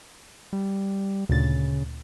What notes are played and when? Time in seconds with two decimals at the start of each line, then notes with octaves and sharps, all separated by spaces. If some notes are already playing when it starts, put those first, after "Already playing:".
0.53 G3
1.29 D2 A#2 C#3 A6